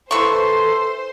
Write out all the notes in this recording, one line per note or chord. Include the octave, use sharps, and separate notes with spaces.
E3 A4 C5 C6 C#6